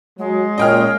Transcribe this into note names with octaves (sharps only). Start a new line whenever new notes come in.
F#3 G#3
A#2 C#4 D#5 G5 F6